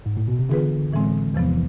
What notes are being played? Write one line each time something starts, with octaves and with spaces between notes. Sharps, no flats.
G#2
A2
B2
C3
D3 E3 B3 F4 G#4 B4
A2 E3 G#3 C4
E2 C3 E3 F3 B3